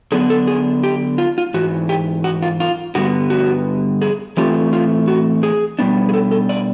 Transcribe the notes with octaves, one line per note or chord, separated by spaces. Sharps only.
D3 F#3 B3 D4 G#4
A4
G#4
G4
F4
F4
G#2 E3 F#4
G4
F#4
F4
F4
G2 D3 G3 B3 F#4
F#4
G#4
A2 E3 A3 C4 F4 G4
F4
F#4
G#4
B2 G3 B3 D4
G#4
A4
A4
D5